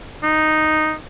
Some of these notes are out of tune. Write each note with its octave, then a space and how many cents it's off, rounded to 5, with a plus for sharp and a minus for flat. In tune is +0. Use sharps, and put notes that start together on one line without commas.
D#4 -5